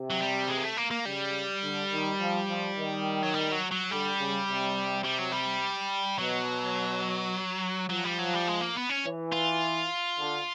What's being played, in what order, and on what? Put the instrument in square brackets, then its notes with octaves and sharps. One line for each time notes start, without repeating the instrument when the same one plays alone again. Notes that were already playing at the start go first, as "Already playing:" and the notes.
Already playing: [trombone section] C3
[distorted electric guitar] F#3
G3
G#3
A#3
A3
A#3
A#3
[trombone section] C#3 [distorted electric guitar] G3
[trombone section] D3
D#3
F3
F3
D#3
[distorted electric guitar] F#3
G3
F#3
F#3
[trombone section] D3 [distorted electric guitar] G3
[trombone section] C#3
C3
[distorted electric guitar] G3
F#3
G3
[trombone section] B2 [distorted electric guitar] F#3
[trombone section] F3 [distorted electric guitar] F#3
[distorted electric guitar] G3
F#3
G3
G#3
A#3
B3
C#4
[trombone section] E3
[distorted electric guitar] F4
[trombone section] D3